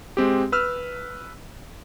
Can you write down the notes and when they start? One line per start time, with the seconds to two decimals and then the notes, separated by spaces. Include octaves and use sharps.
0.17 G#3 C4 G4
0.52 B4 E6 F6